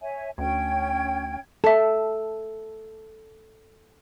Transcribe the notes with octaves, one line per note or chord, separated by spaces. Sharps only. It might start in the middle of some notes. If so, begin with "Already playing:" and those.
C#5 E5 G#5
D2 C#4 G5 G#6
A4 E5 A5